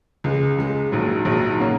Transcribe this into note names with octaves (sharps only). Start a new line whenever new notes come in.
C#2 C#3 G#3
C#2 C#3 G#3
A#1 G#2 D#3 F#3
A#1 G#2 D#3 F#3
C#3 A#3 F#4 C#5